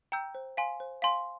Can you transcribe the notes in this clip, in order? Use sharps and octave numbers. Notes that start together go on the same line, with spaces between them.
G5 A#5 E6 G6
C5
F5 G#5 C6
C5
F5 G#5 C6